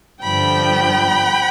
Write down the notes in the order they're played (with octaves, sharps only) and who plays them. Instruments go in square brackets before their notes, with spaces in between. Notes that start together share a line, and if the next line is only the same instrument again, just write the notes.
[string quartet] G2 D3 F3 G5 B5